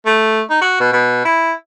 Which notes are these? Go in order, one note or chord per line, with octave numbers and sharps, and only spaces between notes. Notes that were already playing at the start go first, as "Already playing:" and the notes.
A3
D#4
F#4
B2
B2
E4